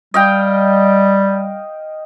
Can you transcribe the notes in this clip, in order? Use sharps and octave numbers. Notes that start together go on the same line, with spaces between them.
G3 D#5 F5 G5